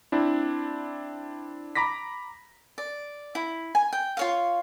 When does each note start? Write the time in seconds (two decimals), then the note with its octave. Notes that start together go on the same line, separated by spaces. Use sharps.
0.12 C4 D4 E4
1.75 A#5 B5 D6 A#6 B6
2.78 D5
3.35 E4
3.75 G#5
3.93 G5
4.17 F4 C#5 F5